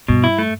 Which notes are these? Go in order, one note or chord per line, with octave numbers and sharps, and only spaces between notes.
G2 B2
E4
A3